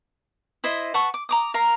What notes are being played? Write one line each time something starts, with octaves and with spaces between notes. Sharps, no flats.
E4 C5 D#5 E5
B4 F#5 A5 C#6
D6
A#5 D6 D#6
A#4 F5 A#5